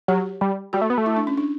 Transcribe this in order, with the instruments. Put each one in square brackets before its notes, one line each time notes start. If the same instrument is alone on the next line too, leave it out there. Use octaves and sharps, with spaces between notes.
[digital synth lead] F#3 [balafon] G4
[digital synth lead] G3
[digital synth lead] G3 [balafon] F#4
[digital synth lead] A3
B3
A3
[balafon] E4
D4
C#4
D4